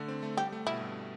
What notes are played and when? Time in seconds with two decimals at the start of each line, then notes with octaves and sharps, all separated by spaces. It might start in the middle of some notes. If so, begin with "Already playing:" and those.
Already playing: D3 A3
0.08 C4
0.23 A3
0.37 G3 G4
0.52 A3
0.66 B2 E4
0.81 G2